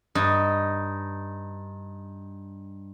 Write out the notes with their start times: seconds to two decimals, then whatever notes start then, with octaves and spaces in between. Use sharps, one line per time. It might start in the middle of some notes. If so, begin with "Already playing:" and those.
0.15 G2 D#4